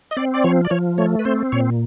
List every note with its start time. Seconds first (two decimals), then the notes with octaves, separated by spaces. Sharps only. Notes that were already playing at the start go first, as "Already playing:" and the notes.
0.11 D#5
0.17 C4 D5
0.34 D5
0.44 F3 C#5
0.65 D5
0.70 F3 C#5
0.98 A3 C#5
1.19 B4
1.25 C4 C5
1.52 A#2 C#5